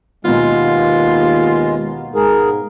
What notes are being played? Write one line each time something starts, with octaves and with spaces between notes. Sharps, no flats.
D#2 B2 G#3 A#3 B3 F4
G#2 G#4 A#4